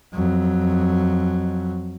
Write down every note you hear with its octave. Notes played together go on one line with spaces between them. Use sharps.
F2 F#3